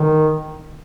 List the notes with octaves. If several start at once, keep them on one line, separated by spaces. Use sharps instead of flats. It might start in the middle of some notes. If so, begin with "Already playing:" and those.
Already playing: D#3